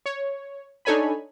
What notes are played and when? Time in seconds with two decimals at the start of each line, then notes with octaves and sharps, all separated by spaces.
0.06 C#5
0.85 D4 D#4 A4 C#5 G#5 B5